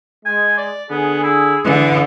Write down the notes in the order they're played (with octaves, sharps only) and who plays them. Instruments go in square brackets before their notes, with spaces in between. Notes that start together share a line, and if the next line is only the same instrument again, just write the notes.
[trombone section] G#3 [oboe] G#5
[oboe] D5
[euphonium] D3 [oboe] B3 [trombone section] G#4
[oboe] E4
[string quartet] D3 [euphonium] E3 [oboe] B3